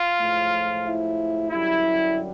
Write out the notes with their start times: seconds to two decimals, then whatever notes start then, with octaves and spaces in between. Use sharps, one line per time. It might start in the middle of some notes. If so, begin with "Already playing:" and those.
Already playing: F4
0.20 A2 F3 G#3
0.85 E4
1.50 F#2 D3 G3 E4